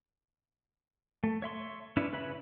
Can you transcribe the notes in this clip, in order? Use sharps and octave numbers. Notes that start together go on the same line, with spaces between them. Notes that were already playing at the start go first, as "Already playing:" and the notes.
A3
C#5 E5 C6 C#6
C#4 D4 E4 B4
C#3 B4 C#5 E5 B5